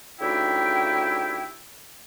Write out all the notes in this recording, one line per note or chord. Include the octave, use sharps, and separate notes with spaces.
D2 C#3 D#4 E4 G4 G5